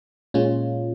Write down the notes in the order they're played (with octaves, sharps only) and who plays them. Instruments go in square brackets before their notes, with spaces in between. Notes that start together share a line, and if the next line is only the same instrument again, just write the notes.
[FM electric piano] A#2 G#3 C#4 F4